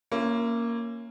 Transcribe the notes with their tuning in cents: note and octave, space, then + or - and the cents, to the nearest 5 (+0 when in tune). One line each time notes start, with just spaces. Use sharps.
A#3 +0 C#4 +0 E4 +45